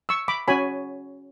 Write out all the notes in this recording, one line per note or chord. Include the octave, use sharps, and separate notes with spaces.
C#6 E6
B5 D6
C#4 F#4 C#5 G#5 B5